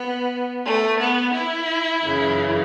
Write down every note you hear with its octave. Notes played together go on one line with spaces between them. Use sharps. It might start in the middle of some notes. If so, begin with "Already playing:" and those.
Already playing: B3
A3
B3
E4
F#2 C#3 E3